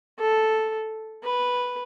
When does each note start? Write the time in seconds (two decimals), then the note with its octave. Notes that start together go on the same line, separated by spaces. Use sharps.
0.20 A4
1.24 B4